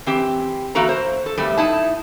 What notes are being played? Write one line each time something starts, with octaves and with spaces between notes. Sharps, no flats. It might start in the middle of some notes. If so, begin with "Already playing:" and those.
E3 C4 G4
E3 A#3 F#4 A4 A#5
C5
A4
E2 G2 G3 A3
D#4 E4 A5